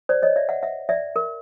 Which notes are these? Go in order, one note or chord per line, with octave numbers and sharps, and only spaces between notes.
C5 D5
C#5 D#5
D5 E5
E5 F#5
E5 F#5
D5 E5
A#4